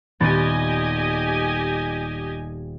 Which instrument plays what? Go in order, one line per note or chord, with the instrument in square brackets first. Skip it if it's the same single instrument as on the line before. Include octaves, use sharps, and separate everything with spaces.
[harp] D#1 B3 A6 [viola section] G4 D#5 G#5